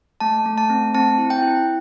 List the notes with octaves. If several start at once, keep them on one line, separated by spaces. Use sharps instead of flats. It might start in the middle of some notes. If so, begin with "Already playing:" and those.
A3 A5
A3
A5
C4
C4 A5
E4
G5
E4